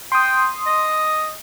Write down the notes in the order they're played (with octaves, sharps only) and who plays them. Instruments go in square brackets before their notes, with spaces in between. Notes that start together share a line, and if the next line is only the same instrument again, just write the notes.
[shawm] G5 [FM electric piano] C6 D#6
[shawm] D#5